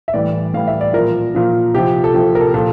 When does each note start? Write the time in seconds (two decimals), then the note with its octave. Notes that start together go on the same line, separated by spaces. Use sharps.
0.08 E5
0.14 A2 E3 G3 D5
0.53 A2 E3 G3 F5
0.67 E5
0.81 D5
0.93 A#2 F3 A#4
1.35 A#2 F3
1.74 C3 F3 G4
2.04 A4
2.14 C3 F3 G4
2.35 A#4
2.41 A4
2.54 A#2 F3 A4